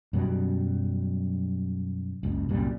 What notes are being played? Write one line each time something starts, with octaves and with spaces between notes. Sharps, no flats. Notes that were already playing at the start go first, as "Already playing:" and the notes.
F#2 B2 F#3 G3
F#1 C#2
C2 F#2 A#2 G3